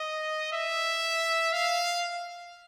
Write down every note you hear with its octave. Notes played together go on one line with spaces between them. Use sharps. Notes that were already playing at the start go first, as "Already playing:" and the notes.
Already playing: D#5
E5
F5